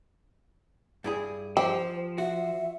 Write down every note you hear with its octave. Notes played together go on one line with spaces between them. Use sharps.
G2 E4 G#4
F3 G4 C5
F#4 E5